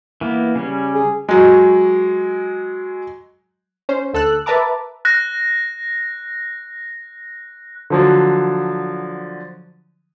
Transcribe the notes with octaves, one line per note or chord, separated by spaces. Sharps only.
E3 A#3 B3
C#3 G3 C#4
G#4
F#3 G#3
C#4 C5
D2 A4 E6 F#6
A#4 B4 E5 A5 A#5 D6
F#6 A#6
D3 F3 F#3